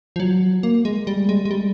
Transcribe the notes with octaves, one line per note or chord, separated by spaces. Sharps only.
F3
F#3
A#3
G#3
G3
G#3
G#3
G3